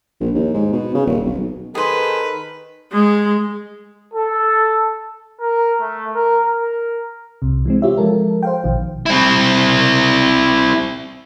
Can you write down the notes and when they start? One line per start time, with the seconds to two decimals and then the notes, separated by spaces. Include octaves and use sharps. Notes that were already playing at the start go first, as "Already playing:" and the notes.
0.21 A#1
0.34 D#2
0.54 G#2
0.72 B2
0.94 C#3
1.06 D#1
1.26 B1
1.75 D#3 G#4 A4 B4 C5
2.92 G#3
4.14 A4
5.40 A#4
5.81 A3
6.15 A#4
6.44 A#4
7.42 C2 C3
7.65 E3 G#3 C4
7.82 F4 G4 C#5 E5
7.97 F3 G#3 A4 A#4
8.43 C5 F5 G5
8.64 A#1 B2 D#3 F3
9.06 C4 E4